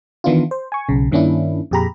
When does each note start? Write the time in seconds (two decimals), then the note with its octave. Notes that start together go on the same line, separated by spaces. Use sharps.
0.24 D#3 E3 B3 D4 E4 F4
0.51 C5
0.72 G#5 C#6
0.89 B1 C#3
1.11 G2 D#3 A#3 C#4 D4 E4
1.71 F2 A#2 G4 G#4 A#5 B5